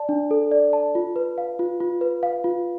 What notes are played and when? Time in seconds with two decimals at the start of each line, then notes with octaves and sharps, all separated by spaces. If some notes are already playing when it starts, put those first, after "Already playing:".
Already playing: D5 A5
0.09 D4
0.31 A4
0.51 D5
0.73 A5
0.95 F4
1.16 B4
1.38 F5
1.59 F4
1.80 F4
2.01 B4
2.23 F5
2.44 F4